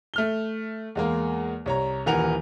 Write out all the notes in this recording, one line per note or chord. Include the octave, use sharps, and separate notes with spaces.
A3 F6 G7
E2 G#3 A#3
C2 C#5 A#5
D#1 E3 A#4 F#5 F7